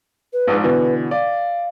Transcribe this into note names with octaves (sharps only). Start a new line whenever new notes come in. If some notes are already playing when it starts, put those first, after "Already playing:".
B4
A#1 G#2
B2 D3 E3 B4
D5 F5